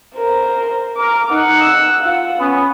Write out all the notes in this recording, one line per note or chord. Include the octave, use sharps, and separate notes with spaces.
A#4 C5
A#4 D6
D#4 F#5
E6
F4 F#5
B3 C#4